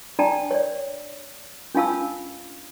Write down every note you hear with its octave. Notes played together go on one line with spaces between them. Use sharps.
D4 D5 G5 A5 A#5
C#5 D5
C#4 D4 F4 F5 A5 E6